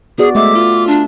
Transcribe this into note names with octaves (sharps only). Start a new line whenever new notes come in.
B3 F#4 G#4 D5
G#3 A3 E5 D6
F4
D4